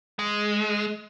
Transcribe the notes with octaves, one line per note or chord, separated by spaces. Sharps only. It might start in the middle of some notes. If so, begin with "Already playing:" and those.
G#3